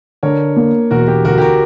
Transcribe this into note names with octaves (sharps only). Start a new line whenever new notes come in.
D3 A#4 C#5
A#3
E1 F#4 A#4
G4
D2 F#4 A#4
G4
F#4 A#4